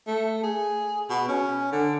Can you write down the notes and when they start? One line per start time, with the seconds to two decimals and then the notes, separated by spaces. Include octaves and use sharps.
0.07 A3
0.43 G#4
1.10 B2
1.28 C#4
1.72 D3